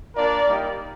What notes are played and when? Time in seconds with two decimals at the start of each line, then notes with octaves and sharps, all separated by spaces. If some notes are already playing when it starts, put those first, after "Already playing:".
0.15 A#3 D4 F4 A#4 D5
0.46 G3 A#3 D#4 G4